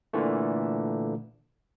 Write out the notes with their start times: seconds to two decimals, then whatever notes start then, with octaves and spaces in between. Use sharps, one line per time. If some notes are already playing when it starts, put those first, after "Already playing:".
0.13 A#2 D3 E3 A3